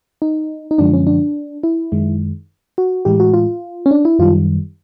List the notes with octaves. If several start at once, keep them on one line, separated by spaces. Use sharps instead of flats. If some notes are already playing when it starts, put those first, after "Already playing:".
D#4
D#4
F#2 D3 F3 G#3 D4
C#4
D4
E4
F#2 D#3 G#3
F#4
A2 E3 G#3 G4
F#4
F4
C#4
D4
E4
F#2 D#3 G3 F4